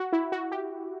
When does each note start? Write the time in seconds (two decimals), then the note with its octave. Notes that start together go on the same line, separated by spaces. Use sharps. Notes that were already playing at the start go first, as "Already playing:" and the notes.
Already playing: F#4
0.13 E4
0.32 F#4
0.51 G4